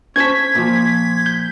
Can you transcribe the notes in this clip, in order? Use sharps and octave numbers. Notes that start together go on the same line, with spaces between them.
C#4 C5 A5 G#6 B6
A#2 F3
G6